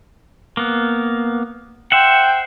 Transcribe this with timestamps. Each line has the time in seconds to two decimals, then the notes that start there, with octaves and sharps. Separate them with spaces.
0.57 A#3 B3
1.92 C5 E5 F#5 G5